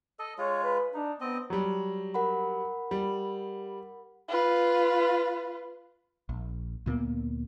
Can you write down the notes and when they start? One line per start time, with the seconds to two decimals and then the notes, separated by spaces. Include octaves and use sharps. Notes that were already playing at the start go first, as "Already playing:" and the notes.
0.19 A4 D#5
0.38 G#3 F4 C#5
0.64 B4
0.94 D4 D#4
1.21 B3 C4 D#5
1.50 F#3 G3
2.14 A#4 F#5 B5
2.91 G3
4.28 F4 B4
6.29 A#1
6.86 D2 A#2 A#3 B3